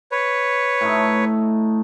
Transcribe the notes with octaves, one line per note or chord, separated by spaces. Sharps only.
B4 C#5
A2 A3 D#4